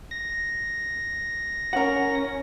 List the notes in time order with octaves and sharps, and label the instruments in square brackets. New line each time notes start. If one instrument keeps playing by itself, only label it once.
[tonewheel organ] A#6
[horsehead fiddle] C#4 [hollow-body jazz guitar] A#4 F#5